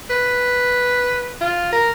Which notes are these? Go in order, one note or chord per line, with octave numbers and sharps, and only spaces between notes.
B4
F4
A#4